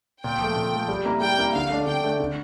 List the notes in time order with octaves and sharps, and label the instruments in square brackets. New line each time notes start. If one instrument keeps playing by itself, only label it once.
[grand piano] A#2 [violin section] G5
[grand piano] F3 A3
A#2
F3 A3
G3
A#3 E4 A#4
[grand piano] G3 [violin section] G5
[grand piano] A#3 E4 A#4
[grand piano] D3 [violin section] F5
[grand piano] A3 D4
[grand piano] D3 [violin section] G5
[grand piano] A3 D4
D3